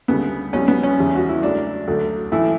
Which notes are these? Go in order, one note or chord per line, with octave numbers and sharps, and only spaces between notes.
D2 C#3 G3 B3
B1 B2 G3 C#4
B3
C#4
E2 C#3 G3
F#4
E4
F#2 C#3 F#3 A3 D4
D2 D3 F#3 A3
B1 A2 E3 A3 E4